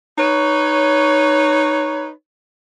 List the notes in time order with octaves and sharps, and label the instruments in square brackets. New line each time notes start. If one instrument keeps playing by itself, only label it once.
[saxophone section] D#4 B4 C#5